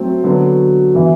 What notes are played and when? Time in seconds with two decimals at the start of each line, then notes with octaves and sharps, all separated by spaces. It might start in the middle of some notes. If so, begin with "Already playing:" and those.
Already playing: F#3 A3 C4
0.23 D3 F#3 B3 D4 F#4
0.95 E3 B3 E4